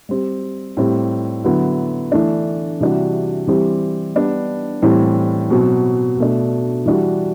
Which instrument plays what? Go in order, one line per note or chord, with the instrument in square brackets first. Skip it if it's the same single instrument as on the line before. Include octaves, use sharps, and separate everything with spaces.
[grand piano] G3 C4 G4
A2 G3 C4 G4
D3 F#3 B3 E4
E3 A3 D4
C3 E3 G3 D4 F#4
E3 G3 C4 G4
G3 B3 D4
A2 E3 G3 C4
B2 F#3 C4 F#4
B2 A3 D4
E3 G3 D4 F#4